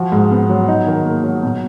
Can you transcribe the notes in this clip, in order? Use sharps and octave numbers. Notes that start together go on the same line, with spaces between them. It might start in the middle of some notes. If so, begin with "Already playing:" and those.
Already playing: F3 F#4
G#2
B3
F#3
D#4
D#3
A#3
F#3
B2